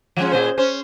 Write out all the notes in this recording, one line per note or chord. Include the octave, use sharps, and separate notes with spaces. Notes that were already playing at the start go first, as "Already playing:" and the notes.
F3 G#3 C#4
A#2 G#4 C5
C#4 C5